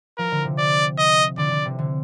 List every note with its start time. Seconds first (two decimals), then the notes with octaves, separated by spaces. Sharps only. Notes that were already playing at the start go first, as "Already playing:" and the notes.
0.18 F3 A#4
0.32 D3
0.45 C3
0.58 D5
0.98 D#5
1.38 D3 D5
1.51 D3
1.66 C3
1.79 D3